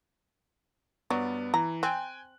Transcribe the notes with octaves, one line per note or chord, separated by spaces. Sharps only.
G2 F#3 B3 D5
E3 A#5
C4 G5 G#5 F#6